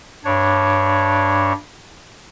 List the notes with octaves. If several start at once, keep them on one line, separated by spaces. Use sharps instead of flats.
G2 D4 C#5